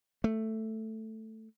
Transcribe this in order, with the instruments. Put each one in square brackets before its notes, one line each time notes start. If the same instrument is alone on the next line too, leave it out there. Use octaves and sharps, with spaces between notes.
[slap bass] A3